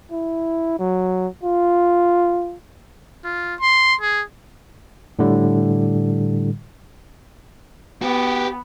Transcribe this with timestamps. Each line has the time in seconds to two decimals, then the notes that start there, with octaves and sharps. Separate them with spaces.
0.12 E4
0.79 F#3
1.43 F4
3.24 F4
3.60 C6
4.01 G#4
5.19 A2 D3 G3
8.02 B3 F#4 G4